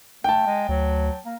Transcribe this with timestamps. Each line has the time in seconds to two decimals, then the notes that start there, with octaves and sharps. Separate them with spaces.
0.24 A3 G5 A5
0.47 G#3
0.69 D2 F#3
1.26 A#3